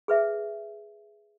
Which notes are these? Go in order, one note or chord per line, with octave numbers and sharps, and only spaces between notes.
G#4 B4 E5